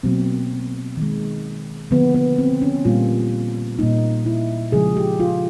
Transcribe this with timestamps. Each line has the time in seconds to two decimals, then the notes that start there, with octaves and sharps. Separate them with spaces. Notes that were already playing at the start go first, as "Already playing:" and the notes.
0.03 B2 F#3 A#3 C4
0.97 D#3 G#3
1.91 D3 F3 A#3 B3
2.14 B3
2.38 C4
2.62 C#4
2.85 A#2 G3 A#3 F4
3.79 A#2 G3 A#3 D#4
4.26 E4
4.72 C#3 F3 G#3 G#4
4.97 G4
5.20 F4